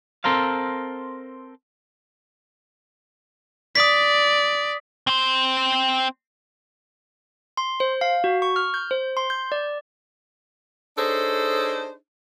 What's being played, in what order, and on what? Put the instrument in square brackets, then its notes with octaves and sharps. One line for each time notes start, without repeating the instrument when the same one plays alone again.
[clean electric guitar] C4 A4 A#4 C5 F5
[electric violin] D5 [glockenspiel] D#6 B6
[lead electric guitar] C4 C5
[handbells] C6
C5
F5
F#4
C#6
F6
G6
C5
C6
G6
D5
[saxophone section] D4 D#4 G#4 A4 C5 C#5